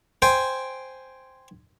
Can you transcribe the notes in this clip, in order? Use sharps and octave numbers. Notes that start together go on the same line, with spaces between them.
C5 G5 G#5